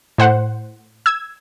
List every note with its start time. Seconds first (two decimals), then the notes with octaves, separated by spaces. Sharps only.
0.18 A2 C5 F#5
1.06 E6 G#6